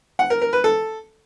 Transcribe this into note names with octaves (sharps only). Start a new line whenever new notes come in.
F#5
A#4
A#4
B4
A4